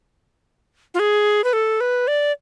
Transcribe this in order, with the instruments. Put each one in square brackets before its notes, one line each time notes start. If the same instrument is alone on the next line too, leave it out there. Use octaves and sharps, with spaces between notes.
[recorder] F4
G#4
B4
A4
B4
D5